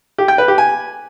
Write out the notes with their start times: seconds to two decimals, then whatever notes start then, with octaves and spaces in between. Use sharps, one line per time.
0.18 G4
0.28 G5
0.38 B4
0.48 G4
0.58 G#5